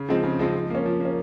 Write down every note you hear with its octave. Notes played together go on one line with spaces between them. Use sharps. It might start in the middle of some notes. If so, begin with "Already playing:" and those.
Already playing: C#3
F3 G#3 C4 D#4
C#3
F3 G#3 C4 D#4
F3
A#3 C#4
F3
A#3 C#4